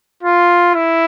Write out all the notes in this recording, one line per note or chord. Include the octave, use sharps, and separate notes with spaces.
F4
E4